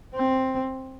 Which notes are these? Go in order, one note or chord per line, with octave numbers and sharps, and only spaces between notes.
C4